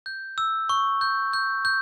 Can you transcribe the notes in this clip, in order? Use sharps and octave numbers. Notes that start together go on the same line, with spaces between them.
G6
E6
C#6
G6
G6
G6